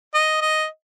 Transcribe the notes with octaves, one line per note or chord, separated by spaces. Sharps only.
D#5
D#5